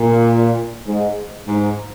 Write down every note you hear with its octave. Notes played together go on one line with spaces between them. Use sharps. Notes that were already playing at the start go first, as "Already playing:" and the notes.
Already playing: A#2
G#2
G#2